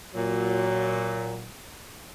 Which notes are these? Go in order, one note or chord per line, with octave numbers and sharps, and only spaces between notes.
A#2 F#3